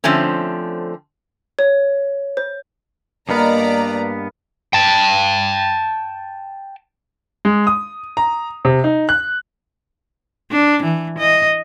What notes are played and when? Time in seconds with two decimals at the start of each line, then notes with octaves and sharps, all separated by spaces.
0.04 D3 F3 A3 C4 C#4
1.59 C#5
2.37 C5
3.29 G2 A#3 B3 A#4 B4 D5 D#5 A#5
4.73 G5 A5
7.45 G#3
7.67 D#6
8.17 A#5
8.65 C3
8.84 D#4
9.09 F#6
10.52 D4
10.84 E3
11.19 D#5